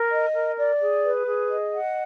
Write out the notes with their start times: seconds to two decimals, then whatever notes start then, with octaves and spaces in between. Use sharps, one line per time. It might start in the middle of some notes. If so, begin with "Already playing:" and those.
Already playing: A#4
0.11 D#5
0.34 A#4
0.57 D5
0.81 G#4
1.04 B4
1.27 G#4
1.50 D#5
1.74 F#5